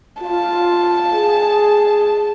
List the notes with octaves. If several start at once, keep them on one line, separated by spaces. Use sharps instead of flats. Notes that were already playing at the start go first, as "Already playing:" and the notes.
F4 A5
G#4